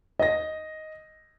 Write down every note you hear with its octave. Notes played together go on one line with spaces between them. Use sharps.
D#5 A#6